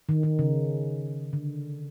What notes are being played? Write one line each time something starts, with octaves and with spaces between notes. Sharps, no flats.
D#3
D#3
C#3
D3